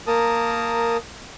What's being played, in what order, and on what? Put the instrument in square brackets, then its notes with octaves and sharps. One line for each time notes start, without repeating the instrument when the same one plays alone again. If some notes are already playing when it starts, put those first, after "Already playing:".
[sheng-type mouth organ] A#3 A#4 A5 D#6